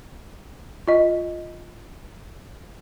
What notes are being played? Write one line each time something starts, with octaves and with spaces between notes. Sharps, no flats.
F4 D#5